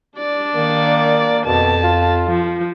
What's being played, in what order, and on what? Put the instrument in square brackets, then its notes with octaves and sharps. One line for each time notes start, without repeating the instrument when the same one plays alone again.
[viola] D4 D5
[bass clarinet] D#3 [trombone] A#3
[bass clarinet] F2 [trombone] B2 [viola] A5
[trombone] F4
[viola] F3